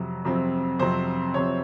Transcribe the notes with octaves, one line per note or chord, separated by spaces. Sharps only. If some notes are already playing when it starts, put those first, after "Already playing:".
Already playing: F2 C3 F#3 C4
F2 C3 F#3 C4
F2 C3 F#3 C4 C5
F2 C3 F#3 C4 C#5